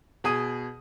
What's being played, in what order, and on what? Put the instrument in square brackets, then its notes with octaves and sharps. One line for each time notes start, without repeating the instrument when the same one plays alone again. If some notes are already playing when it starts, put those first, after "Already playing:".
[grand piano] B2 G#4 D#6 D#7